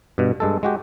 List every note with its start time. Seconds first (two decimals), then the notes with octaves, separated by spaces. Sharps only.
0.18 G2 B2
0.40 G2 G#3 A4
0.63 G#3 F#4 G4